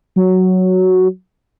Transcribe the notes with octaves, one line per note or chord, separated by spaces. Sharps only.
F#3